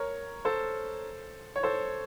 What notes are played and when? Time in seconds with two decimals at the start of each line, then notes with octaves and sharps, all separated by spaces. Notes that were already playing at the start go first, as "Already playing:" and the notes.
Already playing: A#4 C#5
0.45 A4 C5
1.56 C#5
1.63 A4 C5